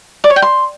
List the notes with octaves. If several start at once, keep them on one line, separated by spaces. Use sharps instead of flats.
D5
C#5
G5
C6